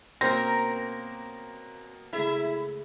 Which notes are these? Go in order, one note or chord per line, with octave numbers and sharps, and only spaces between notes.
B2 A#3 C4 C#4 A#4 A#6
C#3 G#3 A3 E4 E5